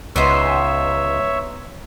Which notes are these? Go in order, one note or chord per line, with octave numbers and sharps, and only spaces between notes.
C#2 B3 D#4 C5 C#5 E5